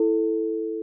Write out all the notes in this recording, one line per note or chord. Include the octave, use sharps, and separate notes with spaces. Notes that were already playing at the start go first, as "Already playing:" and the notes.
Already playing: E4 A4